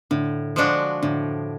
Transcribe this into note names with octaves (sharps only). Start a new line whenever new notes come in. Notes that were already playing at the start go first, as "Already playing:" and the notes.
A2 D3
F3 G#3 D4 F#4
A2 D3